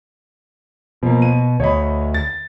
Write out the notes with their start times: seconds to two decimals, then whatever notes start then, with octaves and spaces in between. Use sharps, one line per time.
1.03 B2 F3 A#3
1.22 D#7
1.60 D2 C#5 D#5 B5
2.14 A6